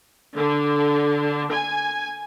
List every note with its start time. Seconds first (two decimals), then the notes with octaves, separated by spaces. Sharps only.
0.35 D3
1.53 G#5